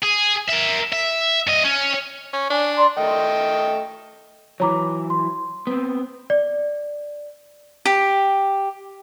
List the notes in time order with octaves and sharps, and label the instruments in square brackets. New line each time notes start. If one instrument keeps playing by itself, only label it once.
[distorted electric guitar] G#4
A#4 E5
E5
G2 D#5
C#4
[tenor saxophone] C#4
[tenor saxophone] D4 [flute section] G#5
[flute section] D5 A#5 C6
[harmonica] A3 D#5 G5
[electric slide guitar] E3 F#3 [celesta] C#5 A#5 D6
[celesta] C6
[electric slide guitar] B3 C4
[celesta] D5
[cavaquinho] G4